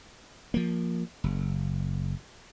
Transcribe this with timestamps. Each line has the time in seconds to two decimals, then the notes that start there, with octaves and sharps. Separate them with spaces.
0.54 F3 A#3
1.24 F#1